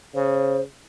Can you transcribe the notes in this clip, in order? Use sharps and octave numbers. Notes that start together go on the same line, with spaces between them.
C#3 C5